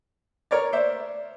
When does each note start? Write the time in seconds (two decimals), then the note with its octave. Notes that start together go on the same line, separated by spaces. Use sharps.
0.51 A#4 C#5 D5
0.73 D2 D4 C5 D5 E5